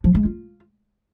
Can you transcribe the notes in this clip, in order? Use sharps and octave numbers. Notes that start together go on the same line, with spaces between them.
F3
G#3
F4